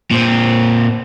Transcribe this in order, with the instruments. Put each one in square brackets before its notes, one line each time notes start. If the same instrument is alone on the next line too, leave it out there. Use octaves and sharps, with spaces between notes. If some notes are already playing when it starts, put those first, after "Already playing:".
[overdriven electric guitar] A#2 C4